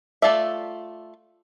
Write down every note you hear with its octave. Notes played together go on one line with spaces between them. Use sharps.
A3 F4 D5 E5